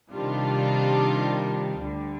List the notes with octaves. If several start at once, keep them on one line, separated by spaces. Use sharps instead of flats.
C3 D#3 G3 D4 F4
D2 D3 G3